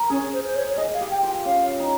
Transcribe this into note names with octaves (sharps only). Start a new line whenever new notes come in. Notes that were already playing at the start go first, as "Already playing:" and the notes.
Already playing: A#4
C#4 G#4
C5
C5
C#5
C#5
G#4 D#5
F5
G4
G5
F4 G5
C#4 F5
D#4